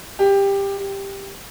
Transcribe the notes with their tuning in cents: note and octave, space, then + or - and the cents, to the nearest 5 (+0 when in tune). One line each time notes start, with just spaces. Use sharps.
G4 +15
G4 +5